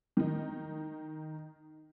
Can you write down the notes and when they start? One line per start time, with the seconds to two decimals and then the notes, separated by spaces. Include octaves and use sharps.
0.17 D#3 D#4